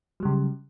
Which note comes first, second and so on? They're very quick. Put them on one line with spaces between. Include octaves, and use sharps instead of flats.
F#3 G3 C#3